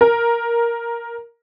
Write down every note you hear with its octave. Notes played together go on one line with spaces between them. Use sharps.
A#4